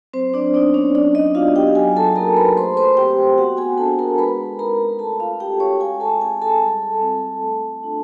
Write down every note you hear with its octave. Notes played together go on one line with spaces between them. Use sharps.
F#3 C4 C5
D4 D5
B3 D4 D#4 D5
C#4 C#5
F#3 D4 D5
D#4 D#5
B3 D4 F4 F#4 F5
G4 G5
F#3 G#4 G#5
A4 A5
A#3 D#4 F#4 A#4 A#5
B4 B5
A3 C5 C6
C5 C6
C4 F4 G4 G5
B3 F#4 F#5
G#4 G#5
D4 F4 A4 A5
A#4 A#5
G#3 B4 B5
C4 D#4 A#4 A#5
A3 A4 A5
F4 F5
C#4 F#4 G4 G5
C#5 C#6
G#3 G#4 G#5
A4 A5
C4 E4 G#4 G#5
A4 A5
G3
C4 F4
A3
D4 F4